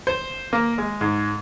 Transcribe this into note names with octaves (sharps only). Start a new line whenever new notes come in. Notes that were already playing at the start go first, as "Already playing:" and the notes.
C5
A#3
G#3
G#2